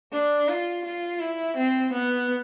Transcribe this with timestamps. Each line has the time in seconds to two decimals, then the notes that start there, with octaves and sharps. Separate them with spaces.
0.12 D4
0.48 F4
0.85 F4
1.20 E4
1.56 C4
1.93 B3